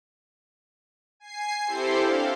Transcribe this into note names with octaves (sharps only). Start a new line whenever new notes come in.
G#5 C7
C4 E4 G4 A4 C5
D4 F5